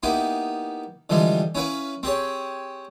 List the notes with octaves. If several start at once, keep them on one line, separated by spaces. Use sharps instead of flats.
A#3 B3 D#4 E4 G4
D3 E3 F3 G3 G#3
C#4 E4 B4 F5
C4 G4 G#4 C#5